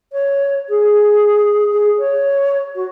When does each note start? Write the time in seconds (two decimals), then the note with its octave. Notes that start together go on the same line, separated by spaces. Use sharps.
0.12 C#5
0.69 G#4
1.69 G#4
1.98 C#5
2.75 F#4